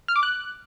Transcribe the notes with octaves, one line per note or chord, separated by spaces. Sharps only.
F6
D6
F#6